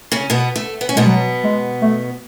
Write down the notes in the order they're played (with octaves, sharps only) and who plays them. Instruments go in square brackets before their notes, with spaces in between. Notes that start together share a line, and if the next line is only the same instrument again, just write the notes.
[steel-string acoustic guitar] C#3 C#4
B2 B3
A3
B3
C#4
[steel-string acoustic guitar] B2 B3 [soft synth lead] G#3
[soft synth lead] F#3
G#3
A3